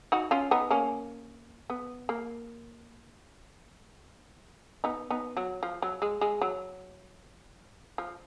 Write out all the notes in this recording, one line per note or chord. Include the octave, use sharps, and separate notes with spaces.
D#4 F#4
C#4 F4
B3 D#4
A#3 C#4
B3
A#3
B3 D#4
B3 D#4
F#3
F3
F#3
G#3
G#3
F#3
F3